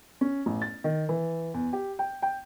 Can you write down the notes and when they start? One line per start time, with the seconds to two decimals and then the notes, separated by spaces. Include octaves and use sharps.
0.21 C#4
0.46 A1
0.62 A6
0.84 D#3
1.09 E3
1.54 E2
1.73 G4
1.99 G5
2.22 G5